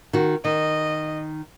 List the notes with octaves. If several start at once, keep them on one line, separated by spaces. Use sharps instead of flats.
D#3 F#4
D#3 D#5